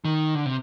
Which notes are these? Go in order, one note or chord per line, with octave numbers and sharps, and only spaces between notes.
D#3
D3
C3